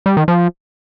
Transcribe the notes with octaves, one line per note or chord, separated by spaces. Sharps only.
G3
D#3
F3